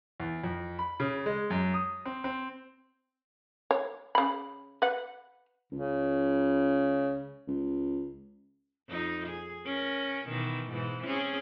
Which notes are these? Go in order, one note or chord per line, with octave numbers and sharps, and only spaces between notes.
E2
F2
B5
C#3
G#3
F#2
D#6
C4
C4
C#5
C#3 B5
B4 F#5
C#2 C#3
C#2
F2 D#4
G#4
C#4 A#4
B2 D#3 E3
G#2 B2 E3
C4 C#4 G#4